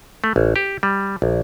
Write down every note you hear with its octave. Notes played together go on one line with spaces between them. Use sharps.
A3
A1
G4
G3
A#1